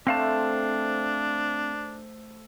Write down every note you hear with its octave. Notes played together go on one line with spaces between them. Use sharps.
A3 C4 D4 C5 F5 A5